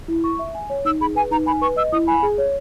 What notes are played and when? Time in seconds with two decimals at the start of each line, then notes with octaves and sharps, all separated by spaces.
0.08 E4
0.24 C#6
0.39 E5
0.55 G#5
0.70 C#5
0.85 D#4 E6
1.01 G#4 B5
1.15 B4 G#5
1.31 D#4 A#5
1.46 G#5 B5
1.61 B4 C#6
1.76 D#5 E6
1.92 E4 D#6
2.07 G#5 B5
2.23 G#4
2.38 C#5